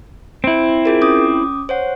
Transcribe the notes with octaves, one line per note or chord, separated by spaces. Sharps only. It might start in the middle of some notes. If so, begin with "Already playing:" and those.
C4 E4
F4 G#4 A#4
C#4 D6 D#6
C5 C#5 F#5